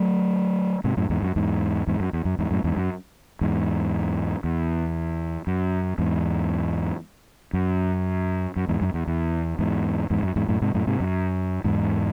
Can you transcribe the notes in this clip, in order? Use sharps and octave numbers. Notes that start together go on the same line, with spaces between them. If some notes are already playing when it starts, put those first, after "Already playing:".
Already playing: F#3 A3
G#2 C3
F#2 A2
E2 G#2
F#2
E2 G#2
E2 G#2
F#2
E2
F#2
E2 G#2
F#2 A2
E2 G#2
F#2
E2 G#2
E2
F#2
E2 G#2
F#2
F#2
E2 G#2
F#2
E2
E2
E2 G#2
E2 G#2
F#2
E2 G#2
F#2 A2
G#2 C3
F#2 A2
G#2 C3
F#2
E2 G#2